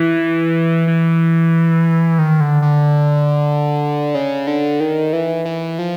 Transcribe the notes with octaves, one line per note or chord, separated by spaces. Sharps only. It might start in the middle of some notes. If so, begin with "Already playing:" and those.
Already playing: E3
E3
D#3
D3
D3
C#3
D3
D#3
E3
E3
F3